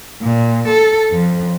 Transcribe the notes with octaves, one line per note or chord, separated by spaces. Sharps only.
A#2
A4
F2